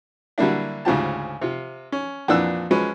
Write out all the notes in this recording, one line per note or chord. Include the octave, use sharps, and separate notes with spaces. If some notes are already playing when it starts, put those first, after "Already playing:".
D3 F#3 G3 A#3 D4 E4
D2 G#2 C#3 F3 G4 A5
C3 F4
C#4
F2 A#2 E3 D4 F#5 E6
F3 F#3 G#3 C#4 B4